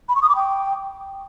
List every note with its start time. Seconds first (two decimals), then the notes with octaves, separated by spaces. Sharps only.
0.09 B5
0.16 C#6
0.22 D#6
0.29 D6
0.36 G5